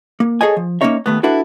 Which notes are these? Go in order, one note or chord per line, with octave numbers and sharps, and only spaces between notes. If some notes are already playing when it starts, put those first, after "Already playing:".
A#3
G#4 A4 C#5 D#5 G#5
F3
A#3 C4 C#4 D#4 C#5 E5
D#2 A3 B3
D4 E4 F#4 A4 B4